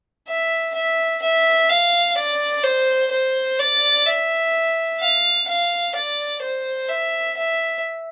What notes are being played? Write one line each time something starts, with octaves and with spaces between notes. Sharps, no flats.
E5
E5
E5
F5
D5
C5
C5
D5
E5
F5
F5
D5
C5
E5
E5